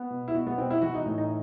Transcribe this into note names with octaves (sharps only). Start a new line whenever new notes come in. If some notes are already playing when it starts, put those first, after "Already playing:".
Already playing: B3
B2
E4
B2 F#4
B3
B2 C4
E4
E3 F#4
D#4
A2
D#4